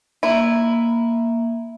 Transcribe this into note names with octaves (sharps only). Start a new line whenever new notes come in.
A#3 E4